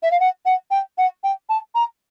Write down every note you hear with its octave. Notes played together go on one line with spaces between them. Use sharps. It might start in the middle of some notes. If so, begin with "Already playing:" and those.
E5
F5
F#5
F#5
G5
F#5
G5
A5
A#5